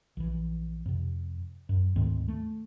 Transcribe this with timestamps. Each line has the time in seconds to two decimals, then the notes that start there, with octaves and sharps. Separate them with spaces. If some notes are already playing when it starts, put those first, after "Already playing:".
0.17 A#1 E3
0.86 F2 C3
1.69 F#2
1.96 D2 G#2 D#3 C4
2.28 A3